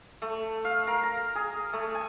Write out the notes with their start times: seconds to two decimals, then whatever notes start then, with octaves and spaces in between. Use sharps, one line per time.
0.22 A3
0.65 F5
0.87 A#4
1.03 A#5
1.35 G#4
1.73 A3
1.95 G#5